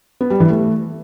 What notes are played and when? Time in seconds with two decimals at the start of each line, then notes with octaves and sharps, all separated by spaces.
0.21 B3
0.30 G3
0.40 E3
0.50 A3